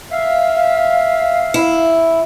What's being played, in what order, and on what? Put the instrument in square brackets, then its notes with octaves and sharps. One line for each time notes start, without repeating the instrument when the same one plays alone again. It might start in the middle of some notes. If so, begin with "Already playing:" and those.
[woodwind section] E5 F5
[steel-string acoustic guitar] E4